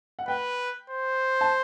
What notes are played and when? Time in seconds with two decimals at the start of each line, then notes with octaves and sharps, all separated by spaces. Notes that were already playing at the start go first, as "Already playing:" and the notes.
0.19 F#5
0.28 B4 G5
0.90 C5
1.41 A5